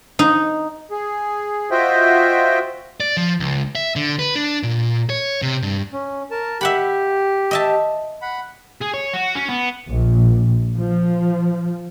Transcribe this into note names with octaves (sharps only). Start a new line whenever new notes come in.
D#4
G#4
F4 F#4 C5 D#5 E5 G5
D5
F3
C#2
E5
D3
B4
D4
A#2
C#5
C3
G2
C#4
A#4 A5
G4 E5 F#5 B5
D#5 E5 A5
F#5 B5
G#4
C#5
F#4
C#4
B3
A#1
F3